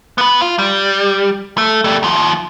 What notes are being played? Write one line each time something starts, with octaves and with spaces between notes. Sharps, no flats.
B3 B4
F4
G3
A3
G3 A3
D#2 F3